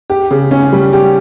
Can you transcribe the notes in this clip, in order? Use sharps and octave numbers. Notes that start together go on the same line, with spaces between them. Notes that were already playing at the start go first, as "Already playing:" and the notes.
G4
C#3
C#4
G3
G4